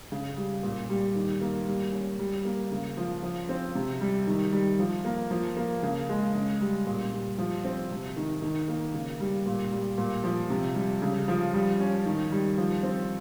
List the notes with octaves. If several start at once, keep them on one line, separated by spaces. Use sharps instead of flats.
C#3
G3
A#2
G3
D#3
A#3
G3
C#4
G3
A#3
C#3
F3
F3
C4
C3
G3
D#3
G3
F3
A#3
F3
A#3
C#3
G#3
C#3
G3
A#2
G3
F3
C4
C3
D#3
D#3
A#3
C#3
G3
A#2
G3
A#2
F3
C3
G3
C#3
F3
G3
C#4
D#3
G3
F3
C4